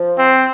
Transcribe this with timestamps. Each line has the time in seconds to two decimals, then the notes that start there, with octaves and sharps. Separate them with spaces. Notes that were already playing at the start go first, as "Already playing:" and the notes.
Already playing: F3
0.18 C4